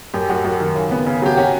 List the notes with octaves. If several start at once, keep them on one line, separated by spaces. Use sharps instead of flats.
F#2 G4
F#2 F#4
F#2 F#4
D#3
C#3
B3
C#3
F#3 G4
C#4 F#4